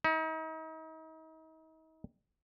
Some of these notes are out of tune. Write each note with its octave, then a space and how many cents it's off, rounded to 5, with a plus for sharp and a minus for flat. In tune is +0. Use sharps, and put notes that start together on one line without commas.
D#4 +40